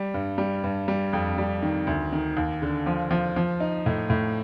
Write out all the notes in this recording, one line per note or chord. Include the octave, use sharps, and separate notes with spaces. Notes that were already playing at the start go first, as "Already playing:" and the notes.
Already playing: G3
G2
G3
G2
G3
F2
G3
D#3
D2
D#3
D#2
D3
F3
F3
F3
D#4
A2
A2